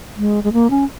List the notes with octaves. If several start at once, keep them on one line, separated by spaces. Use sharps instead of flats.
G#3
G#3
A#3
C#4